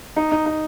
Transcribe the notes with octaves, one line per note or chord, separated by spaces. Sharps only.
D#4
D#4
D#4